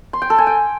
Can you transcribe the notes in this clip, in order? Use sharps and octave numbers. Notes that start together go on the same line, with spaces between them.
C6
G5
A4
G#5
G5